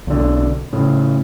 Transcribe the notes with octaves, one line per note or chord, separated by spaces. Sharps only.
B1 D3
A2 C#3